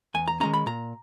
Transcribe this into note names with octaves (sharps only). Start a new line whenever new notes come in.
E2 G#5
A#5
D#3 G#3 C#4 A#5
B5
A#2 A#5